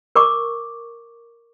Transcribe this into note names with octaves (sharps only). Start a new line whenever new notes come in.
A#4 C#6 D6